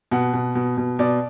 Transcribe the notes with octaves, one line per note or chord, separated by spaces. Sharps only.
B2 F#5
B2
B2
B2
B2 D5